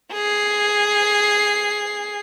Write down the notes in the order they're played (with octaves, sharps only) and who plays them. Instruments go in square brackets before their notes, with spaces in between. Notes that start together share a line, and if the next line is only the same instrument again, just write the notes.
[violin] G#4 C7